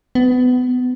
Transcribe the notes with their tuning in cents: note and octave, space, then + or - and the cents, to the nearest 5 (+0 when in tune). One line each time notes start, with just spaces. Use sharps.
B3 +25